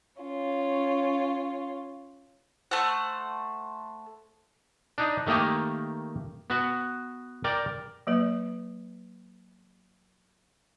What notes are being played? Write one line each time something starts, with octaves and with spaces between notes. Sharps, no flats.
C#4 F4
A3 C5 F#5
D4 D#4
D#3 A3 A#3 G4 D#5
B3 F#4
A#4 D5 G5
F#3 A#3 B4